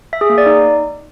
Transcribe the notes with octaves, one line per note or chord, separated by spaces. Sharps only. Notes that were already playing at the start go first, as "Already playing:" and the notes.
E5
G#4
A#3
D5
D#4